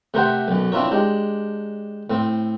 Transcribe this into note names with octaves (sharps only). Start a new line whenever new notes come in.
C3 A3 A#4 C5 F#5 G5
B1 F#2
C4 D4 E4 F4 A#4 C#5
G#3 D4 G4
A2 C4